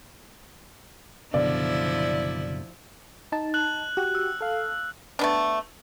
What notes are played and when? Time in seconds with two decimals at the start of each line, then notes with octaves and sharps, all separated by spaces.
1.34 F#1 B2 D3 F3 E4 D5
3.32 D#4 A5
3.54 F#6 F#7
3.97 F#4 G4
4.15 E6
4.41 A4 F5
5.19 A3 B3 D4